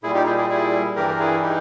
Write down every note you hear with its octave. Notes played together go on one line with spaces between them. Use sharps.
A#2 G3 E4 G#4
D#4 G4
E4 G#4
E4 G#4
E4 G#4
G2 E3 G3 G4 A#4
A#4
E4 G#4
D#4 G4